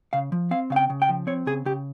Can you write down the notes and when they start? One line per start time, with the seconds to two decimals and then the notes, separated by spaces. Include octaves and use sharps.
0.13 C#3 F5
0.32 F3
0.51 C4 F5
0.70 C#3 F5
0.76 G5
0.90 C#3
1.02 G5
1.09 F3
1.27 C4 C#5
1.46 C#3 G#4
1.65 C#3 G4